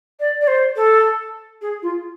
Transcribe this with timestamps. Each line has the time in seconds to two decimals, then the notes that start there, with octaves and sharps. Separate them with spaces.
0.20 D5
0.41 D5
0.47 C5
0.76 A4
1.61 G#4
1.82 F4